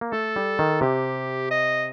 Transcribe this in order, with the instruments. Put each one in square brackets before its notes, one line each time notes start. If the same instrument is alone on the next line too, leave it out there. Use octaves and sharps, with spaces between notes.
[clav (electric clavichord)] A#3
[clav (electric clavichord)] A3 [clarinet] A4
[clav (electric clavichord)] G3
D#3
[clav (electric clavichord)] C3 [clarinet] G4
[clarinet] D#5